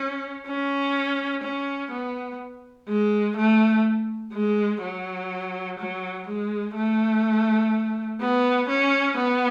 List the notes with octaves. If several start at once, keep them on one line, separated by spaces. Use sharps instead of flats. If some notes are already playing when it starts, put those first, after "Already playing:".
Already playing: C#4
C#4
C#4
B3
G#3
A3
G#3
F#3
F#3
G#3
A3
B3
C#4
B3